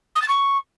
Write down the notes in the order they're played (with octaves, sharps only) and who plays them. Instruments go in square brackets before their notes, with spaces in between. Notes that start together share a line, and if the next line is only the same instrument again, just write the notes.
[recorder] D#6
A6
C#6